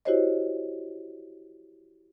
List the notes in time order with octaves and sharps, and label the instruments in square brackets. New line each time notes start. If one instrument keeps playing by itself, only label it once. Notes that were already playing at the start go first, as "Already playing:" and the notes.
[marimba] E4 F#4 G4 C5 C#5 D#5